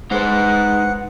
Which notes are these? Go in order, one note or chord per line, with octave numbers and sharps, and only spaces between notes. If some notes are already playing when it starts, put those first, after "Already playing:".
G#3 D#4 B4 C5 F#5